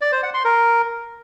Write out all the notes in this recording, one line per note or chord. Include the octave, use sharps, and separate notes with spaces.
D5
C5
F#5
C6
A#4